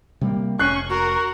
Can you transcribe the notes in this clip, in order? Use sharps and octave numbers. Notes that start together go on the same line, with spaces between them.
C3 G3 A#3
F1 C#4 C#6 F#6 C7
F#4 A#4